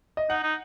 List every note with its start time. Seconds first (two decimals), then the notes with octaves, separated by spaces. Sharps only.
0.17 D#5
0.30 D#4 F#5
0.43 D#4